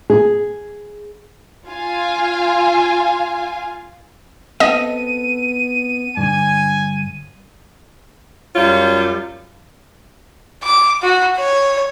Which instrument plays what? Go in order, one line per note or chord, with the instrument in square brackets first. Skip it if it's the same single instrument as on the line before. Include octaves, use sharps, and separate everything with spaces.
[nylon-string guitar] G#4
[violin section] F4 F5 G#5
[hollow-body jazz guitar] B3 C4 A4 [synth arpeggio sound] D#5 [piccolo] D#7
[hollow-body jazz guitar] G2 D3 [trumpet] G#5
[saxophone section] F#2 G3 F4 C#5
[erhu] D6
F#4
C#5